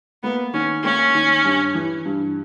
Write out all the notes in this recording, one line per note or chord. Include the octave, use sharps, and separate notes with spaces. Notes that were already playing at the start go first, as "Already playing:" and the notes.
A#3 B3
D#3 C#4
A#3 C#4
D#3
G2
E3
G2